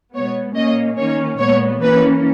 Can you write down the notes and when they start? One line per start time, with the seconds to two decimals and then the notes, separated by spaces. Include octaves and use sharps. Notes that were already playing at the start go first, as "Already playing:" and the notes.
0.15 B2 G#3 B3 C#5
0.56 A#2 A#3 C#4 D#5
0.97 D#3 A#3 C#4 C#5
1.39 A#2 G#3 B3 C#5
1.81 E3 A#3 C#4 B4